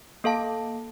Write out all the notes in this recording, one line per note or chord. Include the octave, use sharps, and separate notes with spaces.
A#3 A4 F5 A5